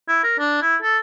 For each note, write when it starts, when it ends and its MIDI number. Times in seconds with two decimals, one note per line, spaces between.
0.08 0.19 64
0.23 0.36 70
0.39 0.61 62
0.62 0.76 64
0.82 0.98 69